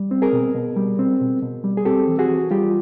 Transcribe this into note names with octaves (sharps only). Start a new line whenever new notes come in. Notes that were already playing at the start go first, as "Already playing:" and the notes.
Already playing: G3
C4
G#4 A#4
B2
B2
G3
C4
B2
B2
G3
G#4
C4 G4 A4
E3
F#4 G#4
E3
G3 F4 G4